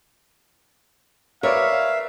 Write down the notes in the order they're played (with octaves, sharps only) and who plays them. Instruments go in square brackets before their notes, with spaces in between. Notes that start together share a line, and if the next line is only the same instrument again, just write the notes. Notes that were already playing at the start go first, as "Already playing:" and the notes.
[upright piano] A#4 B4 D5 [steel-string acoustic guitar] C#5 [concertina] E5 [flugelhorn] F5